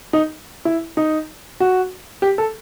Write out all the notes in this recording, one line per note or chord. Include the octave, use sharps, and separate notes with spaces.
D#4
E4
D#4
F#4
G4
A4